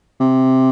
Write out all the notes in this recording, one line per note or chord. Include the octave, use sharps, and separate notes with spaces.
C3